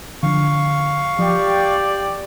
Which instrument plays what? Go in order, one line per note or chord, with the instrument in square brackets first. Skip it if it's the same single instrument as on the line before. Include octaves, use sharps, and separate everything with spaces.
[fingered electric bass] D3 F3 D4 [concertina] F5 C#6
[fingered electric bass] F3 [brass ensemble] G4 D5